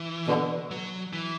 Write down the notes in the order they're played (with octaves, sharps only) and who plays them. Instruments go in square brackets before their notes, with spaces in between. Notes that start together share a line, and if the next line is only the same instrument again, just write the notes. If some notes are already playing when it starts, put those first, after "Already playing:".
Already playing: [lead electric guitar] E3
[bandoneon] B2 D3
[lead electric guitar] F#3
E3